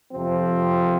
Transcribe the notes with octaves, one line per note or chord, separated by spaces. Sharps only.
F2 C3 F3 C4